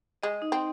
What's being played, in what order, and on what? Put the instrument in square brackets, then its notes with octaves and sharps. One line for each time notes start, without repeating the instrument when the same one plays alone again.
[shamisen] G#3 [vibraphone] D#5
[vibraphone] D#4
[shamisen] C4